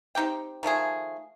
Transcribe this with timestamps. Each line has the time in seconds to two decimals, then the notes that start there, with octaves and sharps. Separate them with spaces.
0.15 C4 D#4 G4 G5
0.63 D#3 F3 A3 G#4